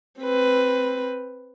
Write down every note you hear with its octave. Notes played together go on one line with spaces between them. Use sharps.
C4 B4